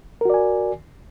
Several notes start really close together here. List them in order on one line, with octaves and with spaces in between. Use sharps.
A#4 F#4 D5 G#5